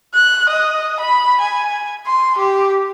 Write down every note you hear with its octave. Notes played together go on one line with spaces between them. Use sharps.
F#6
D#5
B5
G#5
C6
G4